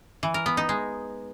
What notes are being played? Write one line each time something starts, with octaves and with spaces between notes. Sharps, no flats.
E3
A#4
B3
D#4
G#3